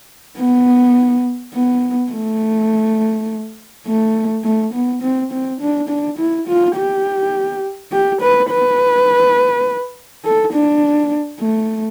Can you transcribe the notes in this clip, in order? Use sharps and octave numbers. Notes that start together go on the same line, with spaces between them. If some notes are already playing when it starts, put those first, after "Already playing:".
B3
B3
A3
A3
A3
B3
C4
C4
D4
D4
E4
F4
G4
G4
B4
B4
A4
D4
A3